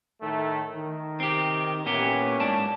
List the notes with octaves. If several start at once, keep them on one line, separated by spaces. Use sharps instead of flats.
A2 D#3 A3
D#3
C4 G4
A#2 E3 A#3 B3 C#4 G4
G#2 D5 A5